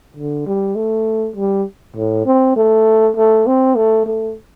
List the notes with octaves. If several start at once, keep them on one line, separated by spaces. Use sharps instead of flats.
D3
G3
A3
G3
A2
C4
A3
A3
C4
A3
A3